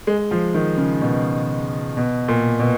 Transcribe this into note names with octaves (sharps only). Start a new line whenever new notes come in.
G#3
F3
D#3
C#3
B2
B2
A#2
B2